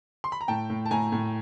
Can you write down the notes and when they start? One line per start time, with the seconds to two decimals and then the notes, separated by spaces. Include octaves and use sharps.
0.24 C6
0.32 B5
0.41 A#5
0.48 A2 G5 A5
0.70 A2
0.86 A5
0.91 A2 G#5 A#5
1.12 A2